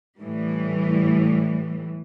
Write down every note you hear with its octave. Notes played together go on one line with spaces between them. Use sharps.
A2 E3 G3